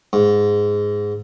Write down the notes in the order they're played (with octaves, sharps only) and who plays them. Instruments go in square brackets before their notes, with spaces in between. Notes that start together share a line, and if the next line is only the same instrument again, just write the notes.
[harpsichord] G#2